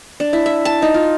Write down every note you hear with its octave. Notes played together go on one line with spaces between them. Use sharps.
D4
E4
E5
A5
D#4
F4